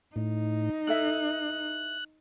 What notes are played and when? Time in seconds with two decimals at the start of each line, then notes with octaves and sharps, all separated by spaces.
0.16 A2 D#4
0.87 E4 A4 E5 F#6